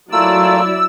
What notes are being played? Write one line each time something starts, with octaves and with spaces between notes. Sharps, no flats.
F#3 A3 A#3 E4 F4 D5 E6